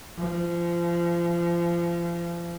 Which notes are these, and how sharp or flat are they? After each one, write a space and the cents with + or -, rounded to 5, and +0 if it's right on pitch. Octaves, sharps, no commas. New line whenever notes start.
F3 -30